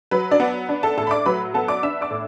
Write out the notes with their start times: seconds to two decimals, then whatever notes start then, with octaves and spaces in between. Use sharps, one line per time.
0.11 F#3 B4
0.31 D4 D5
0.40 B3
0.69 D4
0.83 A4 A5
0.97 A2 A4 A5
1.07 B5
1.11 D5 D6
1.26 F#3 B4 B5
1.54 B3 A4 A5
1.68 D5 D6
1.83 D4 E5 E6
2.01 D5 D6
2.10 A2